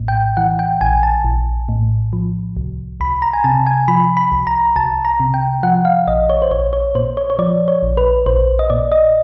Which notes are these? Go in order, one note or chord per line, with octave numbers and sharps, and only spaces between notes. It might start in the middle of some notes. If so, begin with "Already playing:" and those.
Already playing: A#1 A2
G5
E3 F#5
G5
A#1 G#5
A5
A#1
A2
F3
C2
C2 B5
A#5
G#5
C3 A5
G#5
F3 B5
B5
C2
A#5
C2 A5
A#5
C3
G5
F3 F#5
F5
A#1 D#5
C#5
C5
A#1 C#5
C#5
A#2 C5
C#5
C#5
F3 D5
C#5
A#1
B4
A#1 C5
D#5
A#2 D5
D#5